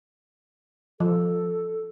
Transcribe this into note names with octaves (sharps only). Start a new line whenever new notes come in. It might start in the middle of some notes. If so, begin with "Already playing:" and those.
F3 A4